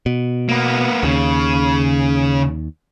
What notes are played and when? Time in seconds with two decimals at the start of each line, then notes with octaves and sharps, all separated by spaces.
0.06 B2
0.49 A#3 B3
1.03 D#2 C#3